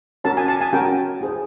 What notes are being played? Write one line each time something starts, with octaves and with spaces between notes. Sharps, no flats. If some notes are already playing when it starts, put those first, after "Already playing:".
C#4 F#4 A#4 C#5 A5
G#5
A5
G#5
C#4 F#4 A#4 C#5 G5
E4 G#4 C5